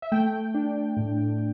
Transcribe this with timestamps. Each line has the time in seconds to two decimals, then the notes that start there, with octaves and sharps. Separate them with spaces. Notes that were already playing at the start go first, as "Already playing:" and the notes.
0.02 E5
0.12 A3 G5
0.54 D4
0.97 A2